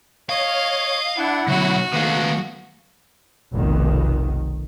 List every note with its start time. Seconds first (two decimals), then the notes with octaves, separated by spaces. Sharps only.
0.29 C#5 D#5 F5
1.17 D4 E4 F#5
1.48 D2 B2 F#3 F#4
1.93 D#2 G#2 A3 B3 F5 F#6
3.52 F1 B1 D#3